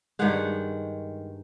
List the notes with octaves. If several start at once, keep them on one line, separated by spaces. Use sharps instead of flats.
G2 D#3 G#3 F#5